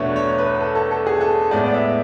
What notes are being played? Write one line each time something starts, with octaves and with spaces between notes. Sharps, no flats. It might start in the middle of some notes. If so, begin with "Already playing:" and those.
Already playing: E2 B2 A3 D4 B4 C#5
C#5
B4
A4
A4
A4
G#4
A4
A2 G#3 B3 D5
D5
E5